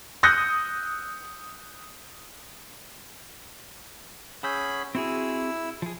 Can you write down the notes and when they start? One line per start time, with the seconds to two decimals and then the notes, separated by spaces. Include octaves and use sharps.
0.23 D#6 E6 F#6 G6 A#6 C#7
4.43 C#4 G#4 F#5 B5 E6 G6
4.95 C4 E4 F#4 G#4 E6
5.82 F3 G#4